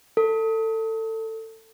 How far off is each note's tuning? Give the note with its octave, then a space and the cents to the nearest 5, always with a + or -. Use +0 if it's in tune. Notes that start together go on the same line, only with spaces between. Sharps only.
A4 +20